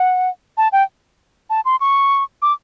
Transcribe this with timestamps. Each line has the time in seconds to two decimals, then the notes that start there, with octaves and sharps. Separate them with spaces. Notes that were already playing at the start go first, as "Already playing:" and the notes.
Already playing: F#5
0.57 A5
0.72 G5
1.50 A5
1.65 C6
1.81 C#6
2.42 D6